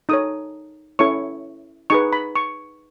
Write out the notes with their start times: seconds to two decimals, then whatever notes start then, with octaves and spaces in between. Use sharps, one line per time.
0.09 D#4 A4 C#5 D#6
0.99 C#4 E4 A4 C#5 C#6
1.90 D#4 G#4 B4 C#6
2.13 B5
2.36 C#6